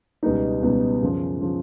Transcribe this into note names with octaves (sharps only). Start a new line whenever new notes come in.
C#2 B2 G3 B3 D#4
C#2 B2 G3 B3 D#4
F#2 C#3 F3
C#3 F3